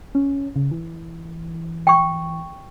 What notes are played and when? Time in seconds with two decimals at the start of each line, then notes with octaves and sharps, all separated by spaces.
0.15 C#4
0.56 C#3
0.71 E3
1.87 G5 C#6